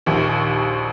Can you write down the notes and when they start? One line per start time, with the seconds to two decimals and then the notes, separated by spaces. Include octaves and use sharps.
0.06 A#1 D#2